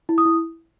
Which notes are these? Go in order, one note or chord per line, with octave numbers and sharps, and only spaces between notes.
E4
D#6
E4